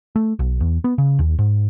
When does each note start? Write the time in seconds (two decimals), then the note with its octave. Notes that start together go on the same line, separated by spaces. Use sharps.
0.16 A3
0.39 B1
0.60 E2
0.84 B3
0.98 C#3
1.19 D#2
1.39 G#2